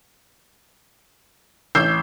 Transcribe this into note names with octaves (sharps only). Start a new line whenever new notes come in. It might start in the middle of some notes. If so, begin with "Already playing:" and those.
A1 E6 G6 C7